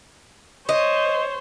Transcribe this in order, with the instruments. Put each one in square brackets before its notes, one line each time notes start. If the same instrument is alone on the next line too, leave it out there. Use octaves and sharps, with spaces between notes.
[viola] C5 C#5 [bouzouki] D#5